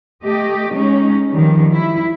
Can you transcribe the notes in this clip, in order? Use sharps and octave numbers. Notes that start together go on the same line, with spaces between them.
A3 G4 D#5
G#3 C#4 D#4
D#3 F3 G3
E4